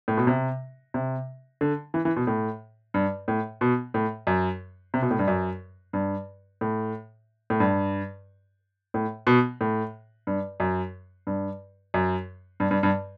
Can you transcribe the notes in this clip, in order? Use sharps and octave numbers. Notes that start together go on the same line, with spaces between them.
A2
B2
C3
C3
D3
E3
E3
B2
A2
G2
A2
B2
A2
F#2
C3
B2
A2
G2
F#2
G2
A2
A2
G2
A2
B2
A2
G2
F#2
G2
F#2
G2
G2
G2